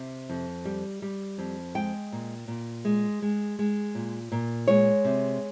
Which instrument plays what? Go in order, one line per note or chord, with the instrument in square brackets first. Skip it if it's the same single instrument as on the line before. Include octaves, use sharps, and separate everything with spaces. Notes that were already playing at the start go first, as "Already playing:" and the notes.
Already playing: [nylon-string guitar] C3
F2
G3
G3
F2
G#3 G5
A#2
A#2
G#3
G#3
G#3
A#2
A#2
G#3 C#5
C3